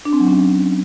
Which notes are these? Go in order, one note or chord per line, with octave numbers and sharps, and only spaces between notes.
D4
C4
F#3
C#4